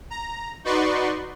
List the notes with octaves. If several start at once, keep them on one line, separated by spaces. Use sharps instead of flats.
A#5
D#4 F#4 B4 D5 C6 C#6